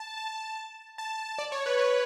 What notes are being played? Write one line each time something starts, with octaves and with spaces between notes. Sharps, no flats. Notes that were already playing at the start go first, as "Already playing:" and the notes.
Already playing: A5
A5
A5
D5
C#5
B4
B4